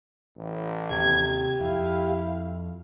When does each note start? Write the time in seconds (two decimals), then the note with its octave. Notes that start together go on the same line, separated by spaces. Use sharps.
0.37 A1
0.90 D#2 C3 G4 G#6
1.61 F2 E4 F5